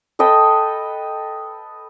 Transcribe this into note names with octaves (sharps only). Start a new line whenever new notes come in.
A4 B4 D#5 G5